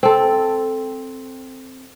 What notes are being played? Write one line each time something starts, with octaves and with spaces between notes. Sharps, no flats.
C4 A4